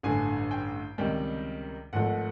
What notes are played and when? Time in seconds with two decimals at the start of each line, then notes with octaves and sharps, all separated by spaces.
0.03 A1 G2 D3 G#5
0.51 G5
0.98 C#2 C3 D#3 G3 G5
1.93 G#1 G#2 F3 A3 F#5